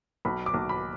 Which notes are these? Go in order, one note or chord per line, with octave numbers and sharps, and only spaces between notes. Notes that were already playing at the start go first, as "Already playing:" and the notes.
B1 B5
D6
B1
B5